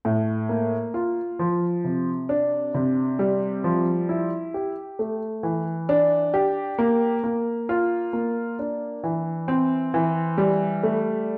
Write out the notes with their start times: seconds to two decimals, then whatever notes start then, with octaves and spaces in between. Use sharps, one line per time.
0.05 A2
0.49 A#3
0.94 F4
1.39 F3
1.84 C3
2.29 D4
2.74 C3
3.19 G3
3.64 F3
4.09 E4
4.54 G4
4.99 A3
5.43 E3
5.89 D4
6.34 G4
6.78 A#3
7.24 A#3
7.69 F4
8.13 A#3
8.59 D4
9.04 E3
9.48 C4
9.94 E3
10.38 G3
10.83 A3